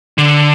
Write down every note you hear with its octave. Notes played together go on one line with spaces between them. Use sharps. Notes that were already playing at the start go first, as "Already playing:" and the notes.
D3